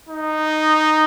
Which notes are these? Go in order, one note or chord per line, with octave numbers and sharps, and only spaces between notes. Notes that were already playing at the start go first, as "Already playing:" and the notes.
D#4